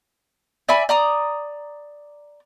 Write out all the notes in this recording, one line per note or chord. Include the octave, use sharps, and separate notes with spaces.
D5 E5 G#5 B5
D5 A#5 D#6